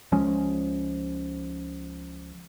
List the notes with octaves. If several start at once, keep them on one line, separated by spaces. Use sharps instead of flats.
C#2 F3 G#3 C#4